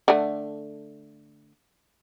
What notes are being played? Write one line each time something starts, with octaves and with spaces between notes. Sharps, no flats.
D3 A3